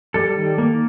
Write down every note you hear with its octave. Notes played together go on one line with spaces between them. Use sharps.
G3 A4
D#3
A#3